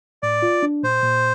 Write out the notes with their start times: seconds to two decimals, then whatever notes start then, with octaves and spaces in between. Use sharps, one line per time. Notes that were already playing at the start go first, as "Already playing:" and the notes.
0.23 A2 D5
0.42 F4
0.63 D4
0.83 A#2 C5
1.03 A#2